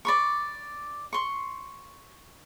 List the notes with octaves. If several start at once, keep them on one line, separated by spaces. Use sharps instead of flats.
D5 B5 C#6
C6 C#6